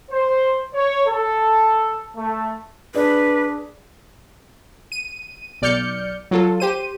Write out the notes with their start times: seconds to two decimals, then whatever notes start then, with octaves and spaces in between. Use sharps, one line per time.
0.11 C5
0.74 C#5
1.07 A4
2.16 A3
2.95 D4 G#4 B4 D5
4.92 D#7
5.62 B1 D5 F6 G6 C#7
6.31 F#3 F4 A4
6.60 G4 C5 D#7